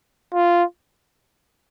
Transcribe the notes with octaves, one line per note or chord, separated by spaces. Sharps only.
F4